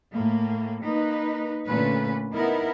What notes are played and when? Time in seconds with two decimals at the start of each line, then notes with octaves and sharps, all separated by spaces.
0.13 A2 A#3
0.83 A#3 D#4 B4
1.66 A#2 D3 A3 C#4 B4
2.34 B3 D#4 E4 A#4